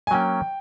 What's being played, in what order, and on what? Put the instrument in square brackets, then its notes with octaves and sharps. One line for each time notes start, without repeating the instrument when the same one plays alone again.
[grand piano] G#5
[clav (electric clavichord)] F#3 A#3 C#4 [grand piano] G5